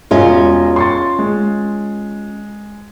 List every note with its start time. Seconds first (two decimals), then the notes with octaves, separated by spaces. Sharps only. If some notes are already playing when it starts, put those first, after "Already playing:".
0.11 E1 C#4 F4 D#5
0.76 C6 C#6 A6
1.19 G#3